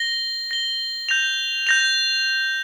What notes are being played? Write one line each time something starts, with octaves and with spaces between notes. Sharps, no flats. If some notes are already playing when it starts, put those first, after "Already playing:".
Already playing: A#6 G7
A#6 G7
G6 A#6 F7
G6 A#6 F7